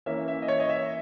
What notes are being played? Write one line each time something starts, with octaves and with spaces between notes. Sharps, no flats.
E3 A#3 C#4 E5
E5
D#5
C#5
D#5
E5